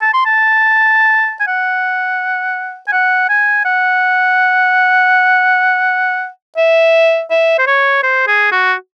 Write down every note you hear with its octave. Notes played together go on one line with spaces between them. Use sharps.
A5
C6
A5
G#5
F#5
G#5
F#5
G#5
F#5
E5
E5
C5
C#5
C5
G#4
F#4